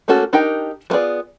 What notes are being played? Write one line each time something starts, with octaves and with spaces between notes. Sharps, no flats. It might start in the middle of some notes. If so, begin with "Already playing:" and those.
A3 A#3 C#4 F#4 A4
D4 D#4 G4 A#4 G5
G3 B3 F4 G#4 D5